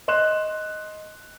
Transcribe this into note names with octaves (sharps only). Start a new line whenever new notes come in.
D#5 C6 F#6 E7